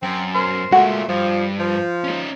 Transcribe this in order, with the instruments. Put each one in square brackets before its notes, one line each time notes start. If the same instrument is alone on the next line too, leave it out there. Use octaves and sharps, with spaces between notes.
[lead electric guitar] F#2 [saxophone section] C4
[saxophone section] B2 A#4 C5
[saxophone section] A#2 A3 [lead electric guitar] G#3 F4 [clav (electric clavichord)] F#4
[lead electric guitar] G2 [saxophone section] F3
[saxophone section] F3
[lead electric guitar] C#4 D#4